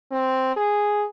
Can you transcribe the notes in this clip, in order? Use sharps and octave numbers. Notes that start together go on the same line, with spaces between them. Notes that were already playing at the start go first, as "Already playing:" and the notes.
C4
G#4